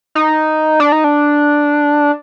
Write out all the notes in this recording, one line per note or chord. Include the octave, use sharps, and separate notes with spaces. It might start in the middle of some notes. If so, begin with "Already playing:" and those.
D#4
D4
D#4
D4